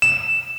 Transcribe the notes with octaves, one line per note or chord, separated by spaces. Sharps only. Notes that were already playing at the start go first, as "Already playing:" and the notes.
E7